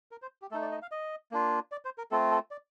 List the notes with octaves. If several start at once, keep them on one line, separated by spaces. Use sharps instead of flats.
A#4
C5
G4
A3 D#4 A4
D5
D#5
F5
D#5
A#3 D4 F4
D5
C5
A#4
A3 C4 F4 A4
A4
D5